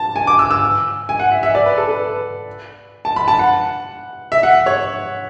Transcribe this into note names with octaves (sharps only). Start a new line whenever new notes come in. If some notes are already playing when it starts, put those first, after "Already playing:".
Already playing: A5
G#5
D6
E6
E6
G#5
F#5
E5
E5
D5
B4
A4
B4
A5
B5
A5
F#5
E5
F#5
C#5